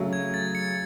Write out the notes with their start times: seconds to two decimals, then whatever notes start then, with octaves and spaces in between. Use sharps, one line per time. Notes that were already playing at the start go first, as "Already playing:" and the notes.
Already playing: C#3 F#3 A3
0.13 G#6
0.34 A6
0.55 C#7